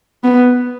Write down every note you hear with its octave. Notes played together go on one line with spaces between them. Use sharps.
B3